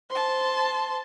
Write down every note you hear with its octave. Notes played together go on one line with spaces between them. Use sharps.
C5 A5 C6